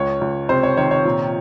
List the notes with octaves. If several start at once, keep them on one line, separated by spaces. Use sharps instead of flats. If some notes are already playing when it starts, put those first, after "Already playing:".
Already playing: C#2 C#5
C#2
C3 C5
C#5
D#3 C#5
C#5
A#2